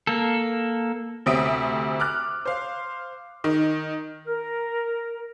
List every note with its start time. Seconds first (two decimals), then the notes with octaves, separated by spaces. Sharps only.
0.07 A#3 A4
1.26 D2 C3 C4 E5 D#6 D7
2.00 D6 F6 F#6
2.45 C5 F5
3.44 D#3
4.27 A#4